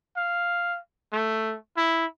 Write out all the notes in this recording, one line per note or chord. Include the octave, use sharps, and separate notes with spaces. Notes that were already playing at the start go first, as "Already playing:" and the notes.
F5
A3
E4